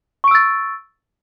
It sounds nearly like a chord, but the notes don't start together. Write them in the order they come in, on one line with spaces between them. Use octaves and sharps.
C#6 D7 E6 A6